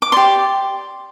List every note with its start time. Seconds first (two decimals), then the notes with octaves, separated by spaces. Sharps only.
0.02 D6
0.12 G4 D5 C6